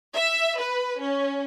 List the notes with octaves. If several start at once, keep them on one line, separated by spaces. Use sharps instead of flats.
E5
B4
C#4